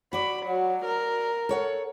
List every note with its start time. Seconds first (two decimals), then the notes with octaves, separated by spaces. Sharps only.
0.13 F#4 D5 B5
0.46 F#3
0.85 A#4
1.49 A4 C#5 F#5